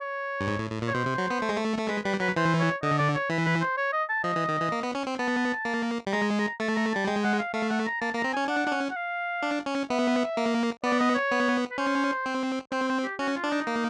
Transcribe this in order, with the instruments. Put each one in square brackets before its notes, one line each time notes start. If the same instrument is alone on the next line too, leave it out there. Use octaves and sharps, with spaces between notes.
[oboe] C#5
[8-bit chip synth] G2
G#2
A2
A2
A#2
[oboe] C#5
[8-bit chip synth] B2 [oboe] C5
[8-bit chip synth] C3
F#3
B3
A3
G#3
A3
A3
[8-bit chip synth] G#3 [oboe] B4
[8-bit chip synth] G3 [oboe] B4
[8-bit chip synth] F#3 [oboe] B4
[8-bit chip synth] E3 [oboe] C5
[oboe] C#5
[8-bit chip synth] D3 [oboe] D#5
[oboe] D5
C#5
[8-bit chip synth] E3 [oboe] B4
[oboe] B4
C5
C#5
D#5
A5
[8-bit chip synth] F3 [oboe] D#5
[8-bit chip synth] E3
D#3
E3
A#3
B3
C#4
C4
[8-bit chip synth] B3 [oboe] A5
[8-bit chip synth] A#3
G3
[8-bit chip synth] G#3 [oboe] A#5
[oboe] A#5
[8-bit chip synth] A3 [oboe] A5
[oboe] A#5
[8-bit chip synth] G3 [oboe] A5
[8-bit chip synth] G#3 [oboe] G5
[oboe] F#5
F5
[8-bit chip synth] A3 [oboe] F5
[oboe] F#5
A#5
[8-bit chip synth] A#3 [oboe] A5
[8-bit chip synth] A#3
[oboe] A#5
[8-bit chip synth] C4
[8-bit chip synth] C#4 [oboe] G#5
[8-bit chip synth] D4 [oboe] F#5
[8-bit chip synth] D4
C#4
[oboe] F#5
F5
[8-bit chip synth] D4
C#4
[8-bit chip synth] B3 [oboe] E5
[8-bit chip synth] A#3
[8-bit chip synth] B3 [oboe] D5
[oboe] D#5
C#5
[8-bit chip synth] B3
[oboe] B4
[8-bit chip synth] C#4 [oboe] C5
[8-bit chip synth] C4
[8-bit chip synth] C4 [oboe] C5
[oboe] C5
G4
[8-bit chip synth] C#4 [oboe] F#4
[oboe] F4
[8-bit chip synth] D4
[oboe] D#4
[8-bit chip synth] A#3